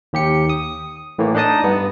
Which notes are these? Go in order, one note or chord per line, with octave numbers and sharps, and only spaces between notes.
D#2 G4 C#7
D#6
A2 E3 A3 A#3
D4 D#4 D#5 A5 D#6
G2 B3